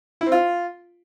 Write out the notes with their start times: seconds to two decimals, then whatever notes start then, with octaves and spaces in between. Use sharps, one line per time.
0.21 E4
0.26 C4
0.32 F4